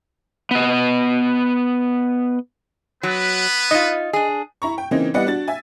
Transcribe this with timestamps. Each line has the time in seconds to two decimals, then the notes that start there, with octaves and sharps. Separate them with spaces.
0.51 B3 D#5
3.03 F#3 B3 B4
3.71 D#4 F4 D#5
4.13 D4 G#4
4.62 E4 A#5 C#6
4.78 G5
4.91 C#3 E3 A#3 C4 D#4
5.14 G3 B3 E4 D5 D#5 F#5
5.26 D4 F#4 A6
5.48 E5 G#5